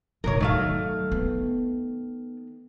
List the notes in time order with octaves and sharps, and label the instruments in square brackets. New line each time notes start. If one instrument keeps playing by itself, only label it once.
[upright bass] G#1 C#3 [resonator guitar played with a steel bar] A#4 C#5
[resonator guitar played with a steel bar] D#3 A3 F5 [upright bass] F#3
[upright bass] B3